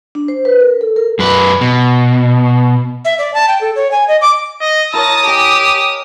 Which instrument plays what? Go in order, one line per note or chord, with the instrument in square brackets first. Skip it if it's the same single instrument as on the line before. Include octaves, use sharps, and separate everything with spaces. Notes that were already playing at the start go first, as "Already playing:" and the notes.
[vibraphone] D4
C5
B4
A#4
A4
A#4
[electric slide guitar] F#2 B4
B2
[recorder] E5
D5
A5
G5
A4
C#5
G#5
D#5
D6
[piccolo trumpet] D#5
[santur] E4 A#4 C#5 [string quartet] A5 A#6 [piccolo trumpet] D#6
[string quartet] G4 [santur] D#5 G#5